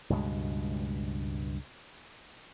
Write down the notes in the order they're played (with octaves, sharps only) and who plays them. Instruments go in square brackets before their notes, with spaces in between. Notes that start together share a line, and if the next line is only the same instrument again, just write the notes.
[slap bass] C#2 G2 B2 G#3